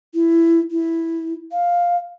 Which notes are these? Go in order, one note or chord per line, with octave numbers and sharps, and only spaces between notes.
E4
E4
F5